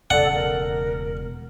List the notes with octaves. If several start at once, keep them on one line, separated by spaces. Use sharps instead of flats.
E1 C#3 A4 D5 F#5
A#4